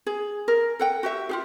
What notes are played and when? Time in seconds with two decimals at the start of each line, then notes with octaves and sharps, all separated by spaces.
0.07 G#4
0.48 A#4
0.79 A4 F#5 G5
1.03 F#4 G4 E5
1.29 F4 G4 G#4